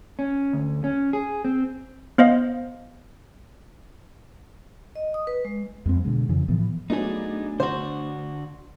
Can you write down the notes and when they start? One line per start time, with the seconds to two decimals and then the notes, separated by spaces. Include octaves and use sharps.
0.19 C#4
0.53 D2
0.84 C#4
1.13 G#4
1.45 C4
2.18 B3 C5 D#5 F5
4.95 D#5
5.14 D#6
5.27 B4
5.45 G#3
5.86 F2 G#3 C4
6.04 B2 D3 G#3
6.29 F2 C#3 E3
6.48 A2 E3 F3 B3
6.90 F#3 A3 B3 D4 D#4 G#4
7.60 D3 F#4 C5